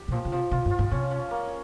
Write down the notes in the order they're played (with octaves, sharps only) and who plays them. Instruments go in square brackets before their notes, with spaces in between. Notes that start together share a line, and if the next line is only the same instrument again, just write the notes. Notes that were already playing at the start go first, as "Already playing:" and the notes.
Already playing: [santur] G4
[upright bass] C3
[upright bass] A#2 [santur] F3
[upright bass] C#3
[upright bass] C3 [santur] F3
[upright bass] C3 [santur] F4
[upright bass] G2
[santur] F4
[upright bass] G#2
[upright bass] C3 [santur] C#4
[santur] C#4
A#3